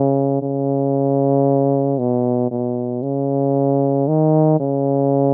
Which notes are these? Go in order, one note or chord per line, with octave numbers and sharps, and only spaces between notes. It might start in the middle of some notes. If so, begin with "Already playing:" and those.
Already playing: C#3
C#3
B2
B2
C#3
D#3
C#3